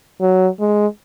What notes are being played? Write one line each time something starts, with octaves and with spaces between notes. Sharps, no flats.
F#3
G#3